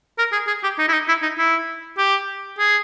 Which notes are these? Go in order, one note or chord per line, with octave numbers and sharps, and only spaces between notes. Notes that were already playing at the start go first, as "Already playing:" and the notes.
A#4
G#4
G#4
G4
D#4
E4
D#4
E4
D#4
E4
G4
G#4